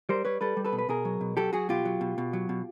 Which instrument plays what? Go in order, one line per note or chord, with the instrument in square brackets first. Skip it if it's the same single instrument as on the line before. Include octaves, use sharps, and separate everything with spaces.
[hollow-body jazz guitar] G3 A#4 C5
G3 B4 C#5
G3 A4 B4
G3
A4 B4
B2
B4
B2 G#4 A#4
F#3
B2
F#3 G4 A4
F#3 F#4 G#4
B2 F4 G4
F#3
B2
B2
F#3
B2